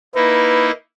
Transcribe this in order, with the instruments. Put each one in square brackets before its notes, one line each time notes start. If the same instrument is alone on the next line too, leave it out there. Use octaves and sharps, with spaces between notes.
[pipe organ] A#3 D#4 E4 [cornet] B4